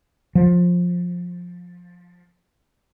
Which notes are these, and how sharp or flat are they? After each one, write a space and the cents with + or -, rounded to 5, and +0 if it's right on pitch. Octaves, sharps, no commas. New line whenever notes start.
F3 +15